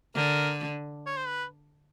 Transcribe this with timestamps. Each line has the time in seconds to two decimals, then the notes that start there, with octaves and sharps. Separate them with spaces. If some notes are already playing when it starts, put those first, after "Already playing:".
0.15 D3 A#4
1.06 C#5
1.17 C5
1.27 B4